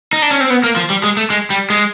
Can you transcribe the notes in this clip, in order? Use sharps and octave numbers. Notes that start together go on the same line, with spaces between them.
D#4
D4
C#4
C4
B3
A#3
F3
G3
G#3
A3
G#3
G3
G#3